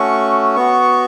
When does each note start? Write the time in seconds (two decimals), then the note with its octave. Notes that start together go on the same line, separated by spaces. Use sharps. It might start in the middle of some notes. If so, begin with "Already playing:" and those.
Already playing: A3 C#4 F#4 C#6
0.56 B3 F#4 C#6